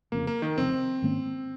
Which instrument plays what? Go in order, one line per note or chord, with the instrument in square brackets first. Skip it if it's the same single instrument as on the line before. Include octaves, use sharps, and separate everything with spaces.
[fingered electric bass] F1 F2 C#3 [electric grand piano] A#3
[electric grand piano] A#3
D#3
[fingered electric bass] F1 F2 C#3 [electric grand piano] C4
[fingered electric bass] G#2 D#3 A#3 C#4